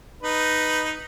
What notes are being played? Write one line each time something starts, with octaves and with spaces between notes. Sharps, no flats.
D#4 B4